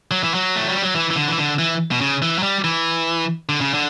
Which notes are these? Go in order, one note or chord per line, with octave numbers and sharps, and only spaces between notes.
F#3
E3
F#3
A3
G3
F#3
E3
E3
D3
E3
D3
E3
B2
C#3
E3
F#3
G3
E3
D3
C#3
D3